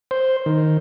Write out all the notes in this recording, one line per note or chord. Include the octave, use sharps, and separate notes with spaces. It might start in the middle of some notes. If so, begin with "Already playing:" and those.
C5
D#3